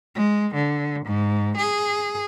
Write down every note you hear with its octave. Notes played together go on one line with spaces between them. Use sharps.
G#3
D3
G#2
G#4